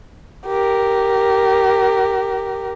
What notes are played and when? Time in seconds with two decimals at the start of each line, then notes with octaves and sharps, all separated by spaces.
0.47 G4 A#4